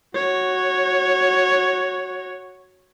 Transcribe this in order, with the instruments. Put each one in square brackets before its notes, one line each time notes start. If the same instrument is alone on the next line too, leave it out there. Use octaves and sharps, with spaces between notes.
[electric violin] F#4 C#5